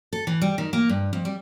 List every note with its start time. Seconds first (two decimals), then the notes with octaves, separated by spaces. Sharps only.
0.13 A4
0.27 E3
0.42 G3
0.58 D#3
0.73 A#3
0.89 G2
1.13 F2
1.25 G3